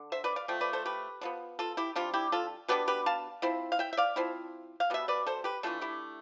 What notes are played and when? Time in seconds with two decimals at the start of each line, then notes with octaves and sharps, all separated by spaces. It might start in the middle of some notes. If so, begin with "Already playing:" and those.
Already playing: D3 D4
0.12 C5 E5
0.24 B4 D5
0.36 D5 F5
0.48 F3 A3 G5
0.61 B4 D5
0.73 A4 C5
0.86 G4 B4
1.21 D3 F3 B3
1.59 F4 A4
1.77 E4 G4
1.96 C3 G3 D4 F4
2.14 E4 G4
2.32 F4 A4
2.68 B2 B3 D4 G4 B4
2.88 G4 B4
3.06 F5 A5
3.42 F3 C4 E4
3.72 F5
3.79 E5 G5
3.93 E5
3.97 D5 F5
4.16 F3 C4 E4
4.80 F5
4.90 B2 G3 B3 E5
5.08 B4 D5
5.27 A4 C5
5.44 G4 B4
5.63 E3 A3 D4 F4 A4
5.81 E4 G4